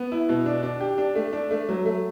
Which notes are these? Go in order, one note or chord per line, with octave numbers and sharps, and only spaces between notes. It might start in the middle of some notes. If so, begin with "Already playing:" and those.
Already playing: B3
E4
B2
D4
D4
G4
D4
A3
D4
A3
F#3
A3